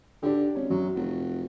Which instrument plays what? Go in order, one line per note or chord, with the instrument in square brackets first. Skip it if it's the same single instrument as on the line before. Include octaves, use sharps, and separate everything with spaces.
[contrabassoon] D3 [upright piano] D4 G4
[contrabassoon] G#1 [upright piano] C#4
[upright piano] F#2 [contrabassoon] F#3
[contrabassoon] F1 [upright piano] F#4